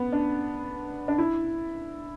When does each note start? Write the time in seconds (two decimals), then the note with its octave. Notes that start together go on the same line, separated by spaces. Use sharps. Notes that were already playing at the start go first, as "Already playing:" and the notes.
Already playing: B3
0.13 D4
1.08 D4
1.18 E4